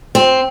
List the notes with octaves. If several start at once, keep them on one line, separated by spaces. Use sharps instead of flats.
C4